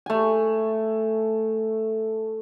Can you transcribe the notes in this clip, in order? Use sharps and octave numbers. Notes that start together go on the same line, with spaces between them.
A3 G#5